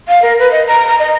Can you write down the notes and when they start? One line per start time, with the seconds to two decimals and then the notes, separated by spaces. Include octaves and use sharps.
0.08 F5
0.22 A#4
0.39 B4
0.51 D#5
0.67 A#5
0.87 A#5
0.99 D#5